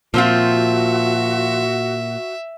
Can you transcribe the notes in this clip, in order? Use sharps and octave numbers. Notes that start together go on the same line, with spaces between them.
A#2 F3 C4 F4 F#4 E5